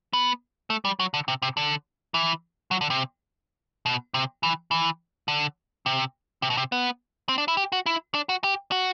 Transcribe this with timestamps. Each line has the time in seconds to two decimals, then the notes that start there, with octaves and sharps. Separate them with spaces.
0.13 B3
0.70 A3
0.85 G3
1.00 F#3
1.14 D3
1.28 C3
1.42 C3
1.57 D3
2.14 E3
2.71 F#3
2.81 D3
2.90 C3
3.86 B2
4.14 C3
4.43 E3
4.71 E3
5.28 D3
5.86 C3
6.42 C3
6.50 B2
6.57 C3
6.72 B3
7.29 C4
7.38 D4
7.48 E4
7.57 G4
7.72 F#4
7.86 E4
8.14 D4
8.29 F#4
8.44 G4
8.72 F#4